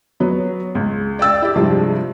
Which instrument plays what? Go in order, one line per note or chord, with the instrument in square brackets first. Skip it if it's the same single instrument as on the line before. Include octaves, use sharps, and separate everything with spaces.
[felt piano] F#3 B3
C#2
D5 G5 E6 A6
E4 G4
G2 C3 F3 G#3